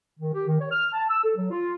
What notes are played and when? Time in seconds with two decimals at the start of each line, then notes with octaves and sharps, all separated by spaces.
0.19 D#3
0.33 G4
0.47 D#3
0.59 C#5
0.72 F6
0.93 A5
1.09 E6
1.23 A4
1.36 F#3
1.49 F4